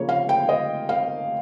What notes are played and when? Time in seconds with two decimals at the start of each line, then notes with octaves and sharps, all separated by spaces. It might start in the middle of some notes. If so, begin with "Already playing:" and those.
Already playing: C#3 F3 A#3 C#5
0.09 F5
0.29 G5
0.49 D#5
0.89 F5